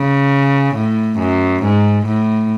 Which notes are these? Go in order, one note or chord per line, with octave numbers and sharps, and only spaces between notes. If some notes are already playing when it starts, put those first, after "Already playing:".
Already playing: C#3
A2
F#2
G#2
A2